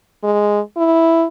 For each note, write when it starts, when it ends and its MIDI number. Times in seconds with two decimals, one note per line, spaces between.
0.24 0.60 56
0.77 1.27 64